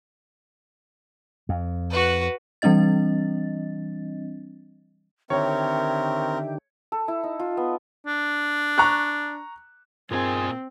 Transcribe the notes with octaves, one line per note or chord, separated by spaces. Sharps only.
F2
F#4 B4
E3 G3 C4 D4 D#5 A6
D3 D#3 C4 G4 A#4 C#5 E5
A4
E4
D#4
F4
B3
D4
A#5 C#6 F#6
G2 A#2 D#3 C4 F4 G#4 A#4 G#5